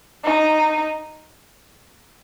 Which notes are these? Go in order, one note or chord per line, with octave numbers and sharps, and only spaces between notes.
D#4